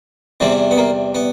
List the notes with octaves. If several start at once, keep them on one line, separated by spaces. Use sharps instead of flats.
E2 C3 E3 G3 C4
B3
A#3
B3